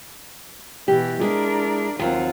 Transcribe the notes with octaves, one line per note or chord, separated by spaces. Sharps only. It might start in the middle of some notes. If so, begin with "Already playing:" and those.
B2 E3 G4
G#3 D4 E4 A#4
D#2 F#3 C4 F4 F#5